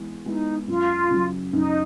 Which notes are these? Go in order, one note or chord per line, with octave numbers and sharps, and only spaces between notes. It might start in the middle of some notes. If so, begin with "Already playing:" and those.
Already playing: E3 G#3 B3
G#3 B3 D#4 E4
F#2 F4
C#3 F#3
F#2 D#4